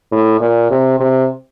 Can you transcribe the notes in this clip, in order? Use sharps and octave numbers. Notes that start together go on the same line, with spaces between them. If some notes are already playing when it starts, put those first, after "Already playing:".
A2
A#2
C3
C3